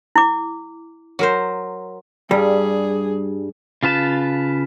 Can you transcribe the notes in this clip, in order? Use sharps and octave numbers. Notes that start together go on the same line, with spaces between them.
E4 D6
F#3 A#4 C5
G2 G3 G#4
C#3 F4 B4 A5